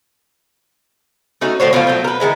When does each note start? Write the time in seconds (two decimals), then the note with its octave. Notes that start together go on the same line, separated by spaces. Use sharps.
1.41 A3 C#4 D#4 F#4
1.60 A2 D3 C5 C#5
1.73 B2 F3 A3 F4
1.87 F#3 A3 G5
2.04 A#4 B4
2.20 D#3 F3 G#3 E4